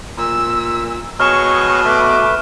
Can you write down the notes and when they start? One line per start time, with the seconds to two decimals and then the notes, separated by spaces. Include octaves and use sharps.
0.18 A#2 E6
1.20 B2 G#4 C#5 D#5 C#6 F6 E7
1.85 A3 B4 D6